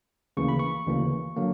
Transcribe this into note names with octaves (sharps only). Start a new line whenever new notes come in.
D2 C#3 E3 A#3 C#6
B5
C#6
D2 C#3 E3 A#3
D3 F#3 A#3